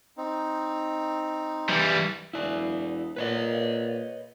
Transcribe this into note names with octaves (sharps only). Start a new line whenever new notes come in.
C4 D#4
E3 G3
E1 E4 D5
A#2 B4 C#5 D#5